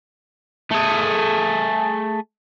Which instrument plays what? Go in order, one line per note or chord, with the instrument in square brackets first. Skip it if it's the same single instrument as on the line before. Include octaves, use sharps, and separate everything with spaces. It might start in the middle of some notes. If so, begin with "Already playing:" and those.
[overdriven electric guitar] A3 G#4